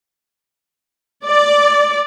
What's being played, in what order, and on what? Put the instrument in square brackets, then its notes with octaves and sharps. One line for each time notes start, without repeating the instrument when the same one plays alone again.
[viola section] D5